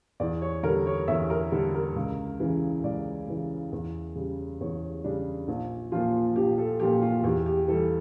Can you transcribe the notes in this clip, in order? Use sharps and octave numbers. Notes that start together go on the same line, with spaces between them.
E2 D5
C#5
D3 A#4
G3
C#5
E2 E5
A#4
D3 G3 A4
A#4
C#2
C#3 E3
C#2 D5
C#3 E3
E2
C#3 G3
E2 C#5
C#3 G3 D4
A#1
A#2 F3 F4
A#1 G4
A4
A#2 F3 G4
F4
E2 G4
G4
E3 G3 A4